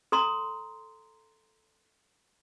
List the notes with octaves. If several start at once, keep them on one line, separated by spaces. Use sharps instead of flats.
A4 A#5 C6